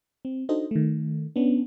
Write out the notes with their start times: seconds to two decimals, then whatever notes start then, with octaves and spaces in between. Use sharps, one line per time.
0.25 C4
0.49 D4 D#4 F#4 A4 C5 D#5
0.71 D#3 A3
1.36 B3 C#4 D4